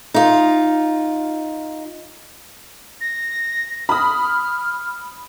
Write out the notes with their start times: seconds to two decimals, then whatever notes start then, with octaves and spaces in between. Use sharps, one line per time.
0.14 D#4 F4
3.01 A#6
3.89 B5 D#6 F6